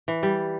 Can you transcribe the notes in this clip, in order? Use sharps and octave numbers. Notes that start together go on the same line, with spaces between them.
E3
G3